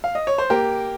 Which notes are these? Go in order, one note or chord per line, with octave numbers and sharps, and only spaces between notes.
F5
D#5
C#5
C5
A#3 G4 A#4